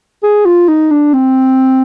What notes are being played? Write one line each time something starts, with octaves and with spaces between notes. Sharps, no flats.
G#4
F4
D#4
D4
C4